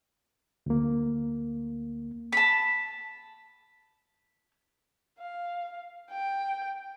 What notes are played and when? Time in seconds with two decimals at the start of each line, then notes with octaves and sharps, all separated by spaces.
0.66 D2 A#3
2.32 A5 B5
5.20 F5
6.11 G5